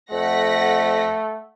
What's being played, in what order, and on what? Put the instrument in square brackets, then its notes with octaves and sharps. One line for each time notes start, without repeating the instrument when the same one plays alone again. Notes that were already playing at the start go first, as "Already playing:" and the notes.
[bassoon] F2 [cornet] A3 [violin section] F#5 A#6 B6